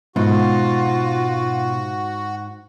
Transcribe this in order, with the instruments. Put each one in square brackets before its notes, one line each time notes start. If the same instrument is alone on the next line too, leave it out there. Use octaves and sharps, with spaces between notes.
[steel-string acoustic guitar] G#2 [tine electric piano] B2 [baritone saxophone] F4 [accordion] F#4